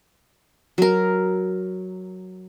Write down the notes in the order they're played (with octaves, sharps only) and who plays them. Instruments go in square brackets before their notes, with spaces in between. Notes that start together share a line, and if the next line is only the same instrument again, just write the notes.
[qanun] F#3 A#4